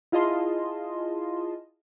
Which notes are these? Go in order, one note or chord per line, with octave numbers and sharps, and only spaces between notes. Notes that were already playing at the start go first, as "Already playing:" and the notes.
E4 F4 G#4 D#5 A5 C6